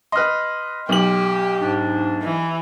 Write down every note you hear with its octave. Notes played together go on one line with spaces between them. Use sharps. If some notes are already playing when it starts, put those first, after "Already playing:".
B4 D#5 C6 F6
B1 G4 F#7
G#2 D4
E3